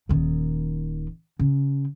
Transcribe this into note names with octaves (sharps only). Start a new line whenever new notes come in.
D#1 D#3
C#3